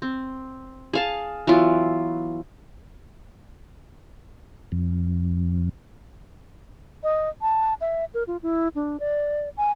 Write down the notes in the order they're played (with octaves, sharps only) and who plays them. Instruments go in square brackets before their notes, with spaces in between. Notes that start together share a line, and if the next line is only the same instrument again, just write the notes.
[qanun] C4
G#4 F5 A5
E3 F#3 B3 F4
[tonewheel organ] F2
[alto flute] D#5
A5
E5
A#4
F4
E4
D4
D5
G#5